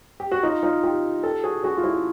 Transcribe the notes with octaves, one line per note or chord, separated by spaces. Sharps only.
G4
F#4
D#4 F4
D#4 F4
F4 G4
G4 A4
F#4 G#4
F#4 G#4
F4
E4 F#4